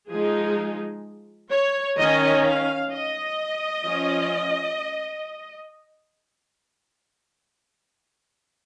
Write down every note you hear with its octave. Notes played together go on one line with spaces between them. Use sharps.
F3 G#3 D#4 G#4
C#5
D#3 C#4 D#5
F5
D#5
F3 C#4